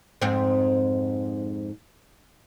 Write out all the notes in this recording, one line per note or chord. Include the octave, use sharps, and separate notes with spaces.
F2 G#2 C4